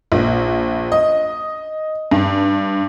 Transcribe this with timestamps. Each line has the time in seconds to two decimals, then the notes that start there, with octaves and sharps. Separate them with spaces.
0.12 A#1
0.92 D#5
2.11 G2